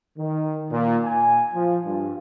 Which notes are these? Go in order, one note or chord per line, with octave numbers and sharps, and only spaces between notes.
D#3
A#2
G#5
F3
G2